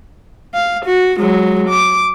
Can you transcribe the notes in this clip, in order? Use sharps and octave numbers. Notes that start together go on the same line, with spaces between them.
F5
F#4
F#3 G#3
D6